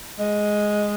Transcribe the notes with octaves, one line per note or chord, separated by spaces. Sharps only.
G#3